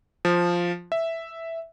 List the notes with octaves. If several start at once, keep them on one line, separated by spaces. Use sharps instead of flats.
F3
E5